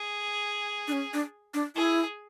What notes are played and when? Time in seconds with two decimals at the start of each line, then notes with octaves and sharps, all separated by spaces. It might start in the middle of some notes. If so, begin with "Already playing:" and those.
Already playing: G#4
0.87 D4
0.92 C#4
1.13 D4
1.54 D4
1.76 E4 G#4